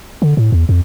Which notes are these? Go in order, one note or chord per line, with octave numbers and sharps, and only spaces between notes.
D3
A2
E2
F2